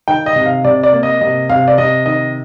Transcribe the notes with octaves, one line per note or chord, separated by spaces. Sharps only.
D#3 G5
D#5
C3
F5
C3 D5
D5
A#3
D#5
C3 D#5
C3 F5
D5
C3 D#5
D#3 D#5